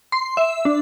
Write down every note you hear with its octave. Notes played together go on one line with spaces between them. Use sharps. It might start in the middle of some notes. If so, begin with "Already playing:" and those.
C6
E5
D4